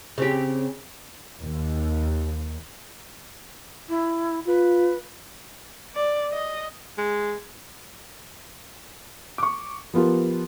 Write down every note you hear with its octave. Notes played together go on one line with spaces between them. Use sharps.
C#3 C4 G4
D#2
E4
F4 B4
D5
D#5
G#3
C#6 D6
F3 B3 F4 G4 A#4